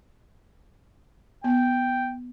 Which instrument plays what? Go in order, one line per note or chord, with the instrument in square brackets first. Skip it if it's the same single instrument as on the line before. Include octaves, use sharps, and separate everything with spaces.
[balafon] B3 [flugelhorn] G5